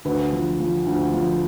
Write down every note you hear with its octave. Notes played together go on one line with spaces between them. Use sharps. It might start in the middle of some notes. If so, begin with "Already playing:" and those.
D2 B4
F3
F3
D2
F3